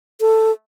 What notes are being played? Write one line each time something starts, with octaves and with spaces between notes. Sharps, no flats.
A4